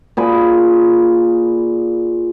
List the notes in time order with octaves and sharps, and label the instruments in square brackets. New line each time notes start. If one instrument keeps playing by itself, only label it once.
[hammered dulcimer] A#2 G#4 B5 D6